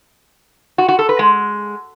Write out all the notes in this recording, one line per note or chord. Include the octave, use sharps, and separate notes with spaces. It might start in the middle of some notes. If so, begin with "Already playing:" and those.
F#4
F#4
A4
B4
G#3